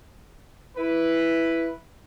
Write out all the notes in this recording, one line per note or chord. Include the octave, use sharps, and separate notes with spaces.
E4 B4